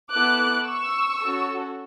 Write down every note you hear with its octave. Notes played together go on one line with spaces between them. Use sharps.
B3 E4 A4 D6 F#6
C#6 E6
C#4 F#4 A4